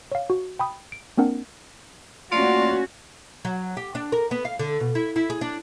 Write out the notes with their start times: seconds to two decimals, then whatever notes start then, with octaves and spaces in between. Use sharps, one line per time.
0.12 C#5 F5
0.30 F#4
0.59 G5 B5 D#6
0.92 D7
1.17 A#3 C4 D4 A#4 F#5
2.32 A3 A#3 C#4 F4 F#4 D5
3.45 F#3
3.77 G4
3.95 D4
4.12 A#4
4.31 B3
4.45 F5
4.59 D3
4.80 B2
4.95 E4
5.16 E4
5.30 G#4
5.41 D4